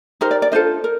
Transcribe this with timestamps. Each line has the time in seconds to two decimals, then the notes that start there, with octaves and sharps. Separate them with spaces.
0.21 D#4 G4 A#4 C5
0.31 D5
0.42 D5
0.52 D4 F4 A4 C5 D#5
0.84 A#4